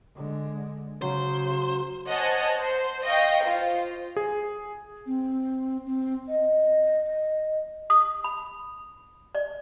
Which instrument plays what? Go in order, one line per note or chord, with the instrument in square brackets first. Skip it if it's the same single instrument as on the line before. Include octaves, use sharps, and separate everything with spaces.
[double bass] D3 G#3
[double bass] C#3 [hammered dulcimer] F#3 [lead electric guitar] C5
[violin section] C5 C#5 D#5 F#5 G#5 A5
C5
D#5 F5 G5 C#6
F4 C5
[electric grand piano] G#4
[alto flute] C4
C4
D#5
[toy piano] D#6
B5
D5